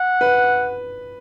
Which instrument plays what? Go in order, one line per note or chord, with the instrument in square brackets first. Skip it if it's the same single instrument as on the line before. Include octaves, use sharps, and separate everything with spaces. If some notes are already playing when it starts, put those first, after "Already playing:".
Already playing: [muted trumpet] F#5
[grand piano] B4